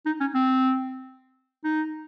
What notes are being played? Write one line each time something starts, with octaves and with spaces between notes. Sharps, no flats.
D#4
C#4
C4
D#4